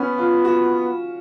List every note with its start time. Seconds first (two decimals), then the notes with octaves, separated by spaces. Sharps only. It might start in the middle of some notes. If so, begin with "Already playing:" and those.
Already playing: B3 C#4
0.18 F4
0.45 F#4